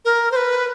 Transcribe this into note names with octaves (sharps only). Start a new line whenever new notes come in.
A#4
C5
B4